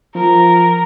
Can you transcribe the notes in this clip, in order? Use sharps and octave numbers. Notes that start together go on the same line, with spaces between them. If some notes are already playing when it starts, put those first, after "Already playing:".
F3 A#4